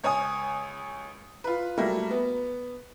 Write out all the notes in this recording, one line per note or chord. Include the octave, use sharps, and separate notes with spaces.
C#2 C#5 G#5 D#6
F4 B4
F#3 G3 A3 A#3
B3